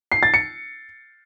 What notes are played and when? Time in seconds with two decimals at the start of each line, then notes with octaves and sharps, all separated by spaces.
0.12 C7
0.23 A6
0.34 C#7